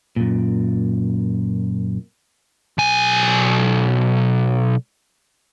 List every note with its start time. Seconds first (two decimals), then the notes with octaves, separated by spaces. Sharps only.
0.16 F#2 A#2
2.78 B1 G#5